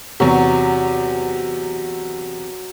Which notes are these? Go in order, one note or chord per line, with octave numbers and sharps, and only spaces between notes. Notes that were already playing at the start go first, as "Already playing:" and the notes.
E2 C3 F#3 D#6